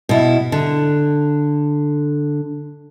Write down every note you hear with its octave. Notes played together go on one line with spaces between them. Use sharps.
B2 E4
D3